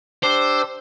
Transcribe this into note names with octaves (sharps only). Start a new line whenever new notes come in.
D4 G4 C5 E6